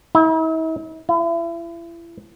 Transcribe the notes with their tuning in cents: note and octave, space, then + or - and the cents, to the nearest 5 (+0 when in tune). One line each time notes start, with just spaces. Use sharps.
E4 -45
E4 +35